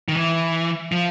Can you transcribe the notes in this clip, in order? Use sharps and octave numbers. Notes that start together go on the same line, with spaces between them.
D#3
E3
F3